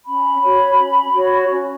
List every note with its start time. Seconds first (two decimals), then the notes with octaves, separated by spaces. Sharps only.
0.06 C#4 B5
0.42 F#4 C#5
0.78 C#4
1.14 F#4 C#5
1.50 C#4